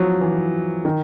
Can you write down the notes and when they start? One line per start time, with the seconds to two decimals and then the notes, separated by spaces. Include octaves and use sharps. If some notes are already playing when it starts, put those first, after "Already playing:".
Already playing: F3 F#3
0.21 E3
0.85 D#3